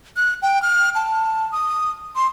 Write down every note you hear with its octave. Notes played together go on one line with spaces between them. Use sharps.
F#6
G5
F6
A5
D#6
C6